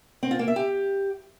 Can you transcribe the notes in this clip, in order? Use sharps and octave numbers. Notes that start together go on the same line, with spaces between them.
C4
F4
A#3
E5
G4